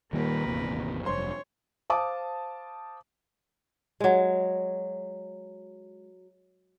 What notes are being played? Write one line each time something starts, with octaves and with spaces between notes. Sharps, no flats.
D#1 D#3 G3 A#3 A#4 B4
G#1 E2 C3
F1 G2 C5 C#5 C6
C5 F5 A5 D6 D#6
F#3 G#3